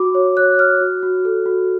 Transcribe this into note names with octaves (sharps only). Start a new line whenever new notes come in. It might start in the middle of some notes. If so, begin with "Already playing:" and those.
Already playing: F#4 D6
C#5
C#5 F#6
C#5 F6
F#4
F#4
A4
F#4